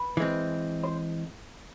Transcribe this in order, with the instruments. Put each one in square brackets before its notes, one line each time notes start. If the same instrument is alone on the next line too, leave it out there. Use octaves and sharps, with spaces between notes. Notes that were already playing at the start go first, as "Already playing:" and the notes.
Already playing: [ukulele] B4
[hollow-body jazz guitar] E3 G#3 C4
[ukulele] C5